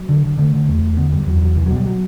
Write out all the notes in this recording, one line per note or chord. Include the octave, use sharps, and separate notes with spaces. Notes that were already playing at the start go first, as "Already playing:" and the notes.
Already playing: F#3
D3
D3
D3 A3
D3
E2 A3
E2
D3 B3
F#2 G3
E2 F#3
E2 F#3
C2 E3
B2 F#3
G3
F#3